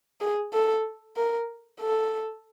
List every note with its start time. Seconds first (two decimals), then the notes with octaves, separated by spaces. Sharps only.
0.21 G#4
0.53 A4
1.17 A#4
1.81 A4